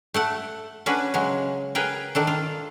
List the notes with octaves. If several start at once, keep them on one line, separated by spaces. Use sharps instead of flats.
A3 A4 F#5
C#4 D4 F#4 B4
C#3 F#3 G#3
G#4 A#4 B4 G5
D#3 D4 A4
F4